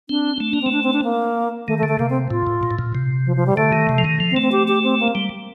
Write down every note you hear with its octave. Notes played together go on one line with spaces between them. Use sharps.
C4 D4
A3
A#3 D4
C4
A3
D4
C4
D4
A#3
D#3 A3
A3
D3
A3
C3 A#3
C4
A2 F4
A2
A#2
A2
A#2
C3
F3
F3
G3
D3 A3
D#3
C3
F3
D#3
F3
C4
A3
C4
G4
G4
C4
A#3
G3